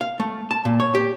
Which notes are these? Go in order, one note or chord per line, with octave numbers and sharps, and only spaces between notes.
F5
A3
A5
A#2
C#5
G4